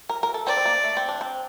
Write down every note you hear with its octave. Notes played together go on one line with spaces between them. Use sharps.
A#4
A#4
A4
C4 D5
C4
A#3
A3
C4
D4
C4